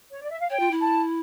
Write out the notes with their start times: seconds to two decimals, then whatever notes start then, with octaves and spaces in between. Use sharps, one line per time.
0.12 C#5
0.22 D5
0.30 E5
0.41 F5
0.50 C#5 G5
0.60 F4
0.71 E4
0.81 A5